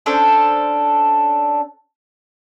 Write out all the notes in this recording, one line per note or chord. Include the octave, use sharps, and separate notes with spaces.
C#4 D4 A4 C5